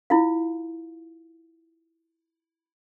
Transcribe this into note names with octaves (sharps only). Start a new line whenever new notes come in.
E4 F4 F5